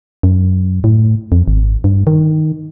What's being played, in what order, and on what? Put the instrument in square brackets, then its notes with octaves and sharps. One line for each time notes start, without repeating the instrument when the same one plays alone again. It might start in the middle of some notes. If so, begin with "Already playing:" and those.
[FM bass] F#2
A2
F2
G#1
G2
D#3